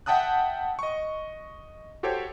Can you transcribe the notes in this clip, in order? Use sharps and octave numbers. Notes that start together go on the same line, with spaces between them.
E5 F#5 G5 A5 D#6 F#6
D#5 C#6
F#4 G4 A4 C5 C#5 G5